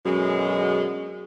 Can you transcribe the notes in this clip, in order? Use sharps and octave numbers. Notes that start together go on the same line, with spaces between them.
F#2 B2 D3 G#3